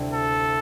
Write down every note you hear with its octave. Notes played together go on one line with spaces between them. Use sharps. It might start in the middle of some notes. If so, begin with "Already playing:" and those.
Already playing: D2 C3 G3 C4 E4
A4